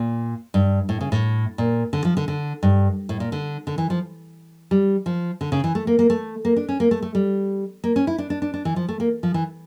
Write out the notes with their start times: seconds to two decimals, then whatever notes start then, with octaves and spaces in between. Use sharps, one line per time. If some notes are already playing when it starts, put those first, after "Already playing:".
Already playing: A#2
0.54 G2
0.89 A2
1.01 C#3
1.12 A2
1.58 A#2
1.93 D3
2.05 F3
2.17 D3
2.28 D3
2.63 G2
3.09 A2
3.20 A#2
3.32 D3
3.67 D3
3.78 E3
3.90 F3
4.71 G3
5.06 F3
5.41 D3
5.52 C#3
5.64 E3
5.75 A3
5.87 A#3
5.99 A#3
6.10 A3
6.45 A#3
6.56 D4
6.69 C#4
6.80 A#3
6.91 A3
7.02 A3
7.15 G3
7.84 A#3
7.96 C#4
8.07 E4
8.18 D4
8.30 D4
8.42 D4
8.54 D4
8.65 E3
8.76 F3
8.89 A3
9.00 A#3
9.23 F3
9.34 E3